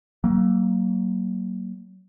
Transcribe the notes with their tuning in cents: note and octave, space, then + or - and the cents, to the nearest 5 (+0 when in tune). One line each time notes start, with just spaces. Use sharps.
F#3 +30 A#3 +0